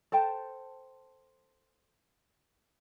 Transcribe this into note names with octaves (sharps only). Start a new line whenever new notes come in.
A4 C5 G5 A5